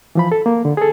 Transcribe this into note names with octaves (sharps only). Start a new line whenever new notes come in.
E3 F3 B5
A4
A#3
D3
G#4 A4